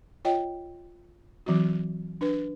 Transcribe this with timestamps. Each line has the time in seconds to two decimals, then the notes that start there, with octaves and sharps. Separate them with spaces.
0.25 F4 C#5 D#5 G5
1.46 E3 F#3 C4 F#4
2.21 D4 B4